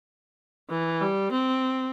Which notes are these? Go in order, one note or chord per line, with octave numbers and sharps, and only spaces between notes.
E3
G3
C4